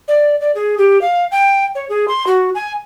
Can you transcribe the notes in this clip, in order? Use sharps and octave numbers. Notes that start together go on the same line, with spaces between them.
D5
D5
G#4
G4
F5
G5
C#5
G#4
C6
F#4
G#5